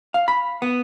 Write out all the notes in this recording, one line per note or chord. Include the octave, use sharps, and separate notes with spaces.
F5
B5
B3